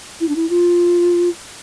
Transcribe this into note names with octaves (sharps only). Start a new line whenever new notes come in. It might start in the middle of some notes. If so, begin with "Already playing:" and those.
E4
D4
E4
F4